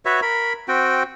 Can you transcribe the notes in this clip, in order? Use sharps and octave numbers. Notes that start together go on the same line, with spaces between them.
F#4 B4 C#5 E5
A#4 B5
C4 F#4 G5